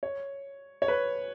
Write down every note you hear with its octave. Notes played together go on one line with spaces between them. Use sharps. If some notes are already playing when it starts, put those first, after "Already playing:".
C#5
C#5
B4